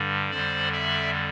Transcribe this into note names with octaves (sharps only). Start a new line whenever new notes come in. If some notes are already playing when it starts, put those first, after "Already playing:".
Already playing: G2 D3 G3
F2 D3 G3 C5 D5
D5 E5